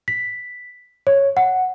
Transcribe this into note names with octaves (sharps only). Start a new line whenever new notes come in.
B6
C#5
F#5